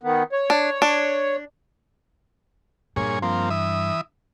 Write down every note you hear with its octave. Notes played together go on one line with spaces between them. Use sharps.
D#3 B3
C#5
D4
D4
G2 A#2 G#4 C#5
F3 A#3 C4
E3 E5 D#6